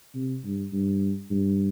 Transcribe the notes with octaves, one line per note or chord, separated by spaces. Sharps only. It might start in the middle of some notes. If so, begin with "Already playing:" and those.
C3
G2
G2
G2